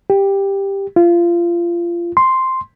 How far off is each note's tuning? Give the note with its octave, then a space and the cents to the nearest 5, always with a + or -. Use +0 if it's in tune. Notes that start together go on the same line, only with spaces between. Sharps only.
G4 +10
F4 -25
C6 +0